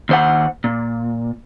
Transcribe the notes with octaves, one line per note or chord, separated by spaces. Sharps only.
D#2 C5 F#5
A#2